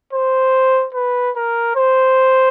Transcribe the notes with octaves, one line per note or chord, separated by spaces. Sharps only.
C5
B4
A#4
C5